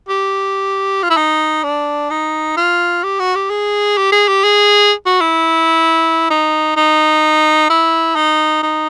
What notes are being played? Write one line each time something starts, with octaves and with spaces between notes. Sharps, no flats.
G4
F4
E4
D#4
D4
D#4
F4
G4
F#4
G4
G#4
G4
G#4
G4
G#4
F#4
E4
D#4
D#4
E4
D#4
D#4